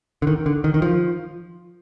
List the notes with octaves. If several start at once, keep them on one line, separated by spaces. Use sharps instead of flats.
D3
D#3
D3
D#3
D#3
F3